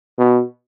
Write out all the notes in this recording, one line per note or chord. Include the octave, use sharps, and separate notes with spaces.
B2